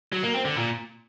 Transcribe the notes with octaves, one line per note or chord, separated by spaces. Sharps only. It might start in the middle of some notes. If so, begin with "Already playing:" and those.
F#3
A#3
C4
D3
A#2